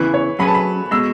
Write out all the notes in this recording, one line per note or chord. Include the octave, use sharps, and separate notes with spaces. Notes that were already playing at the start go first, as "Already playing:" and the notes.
Already playing: E2 C#3 E3 B4
C#5
F#3 C#4 G#4 B4 B5
A5
B5
B2 G#3 E6